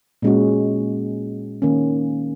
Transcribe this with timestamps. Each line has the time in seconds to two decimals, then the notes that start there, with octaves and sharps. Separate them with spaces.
0.22 A#2 G#3 C#4 F#4
1.62 D#3 A#3 C#4